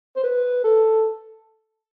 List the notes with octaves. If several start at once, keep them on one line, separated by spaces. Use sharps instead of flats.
C5
B4
A4